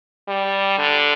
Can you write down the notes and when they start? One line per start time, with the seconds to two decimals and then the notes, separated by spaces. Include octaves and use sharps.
0.28 G3
0.78 D3